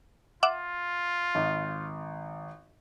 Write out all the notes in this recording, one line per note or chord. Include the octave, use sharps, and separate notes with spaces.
F4 E5 F#5 D6
G#1